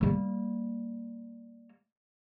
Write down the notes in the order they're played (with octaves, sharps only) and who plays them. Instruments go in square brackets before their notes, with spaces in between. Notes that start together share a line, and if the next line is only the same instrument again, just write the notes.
[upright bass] G3 A#3